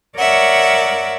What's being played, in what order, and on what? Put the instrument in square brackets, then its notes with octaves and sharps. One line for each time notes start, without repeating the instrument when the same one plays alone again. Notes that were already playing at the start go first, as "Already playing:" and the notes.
[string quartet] A#4 C#5 D5 E5 F#5